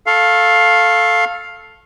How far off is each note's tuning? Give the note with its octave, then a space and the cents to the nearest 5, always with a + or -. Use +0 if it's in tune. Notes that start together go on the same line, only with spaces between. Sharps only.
A4 +0 F5 +5 C#6 -30